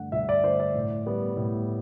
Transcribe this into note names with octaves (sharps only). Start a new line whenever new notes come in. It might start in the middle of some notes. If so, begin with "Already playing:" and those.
Already playing: G2 D3 A3 F#5
G2 E5
D5
D3 A3 C5
D5
A2
G3 B3
A2